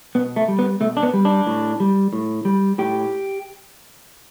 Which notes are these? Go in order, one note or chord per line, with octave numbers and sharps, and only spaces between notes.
B2 B3
A3
G3
B3
B2 A3
D4
B3
G3
D4
A2
G3
A2
G3
A2 G4